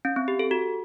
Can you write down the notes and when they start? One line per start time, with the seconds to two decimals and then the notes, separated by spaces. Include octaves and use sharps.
0.05 C#4
0.16 C4
0.28 G4
0.39 A4
0.51 F#4